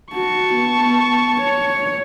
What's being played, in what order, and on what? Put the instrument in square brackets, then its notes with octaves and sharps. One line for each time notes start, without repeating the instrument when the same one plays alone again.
[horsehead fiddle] F#4 [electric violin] A5 C#6
[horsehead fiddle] B3
C#5